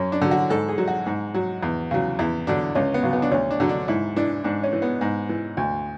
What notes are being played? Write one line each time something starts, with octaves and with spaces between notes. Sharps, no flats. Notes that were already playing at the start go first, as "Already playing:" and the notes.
Already playing: F#2 C#4
D4
D3 F#3
F#4
G#2 A4
G#4
F#3
F#4
G#2
F#3
E2
C#3 F#3
E2 E4
D3 F#3 D4
C#2 C#4
B3
C#3 F#3
B3
D4
D2 C#4
D4
D3 F#3
D4
G#2 E4
E3 D4
G#2 D4
C#4
E3
B3
G#2
E3
D2